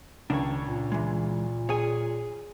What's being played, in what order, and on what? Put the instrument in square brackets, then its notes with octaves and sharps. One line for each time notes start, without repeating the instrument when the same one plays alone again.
[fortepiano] C#2 [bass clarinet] D#3 [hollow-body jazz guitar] D4 C#5
[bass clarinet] A#2
[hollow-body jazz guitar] E3 G#3
[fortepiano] G#4 [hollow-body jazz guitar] C#5 G#5